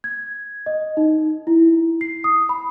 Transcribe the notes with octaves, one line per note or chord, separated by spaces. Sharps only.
G#6
D#5
D#4
E4
C7
D#6
B5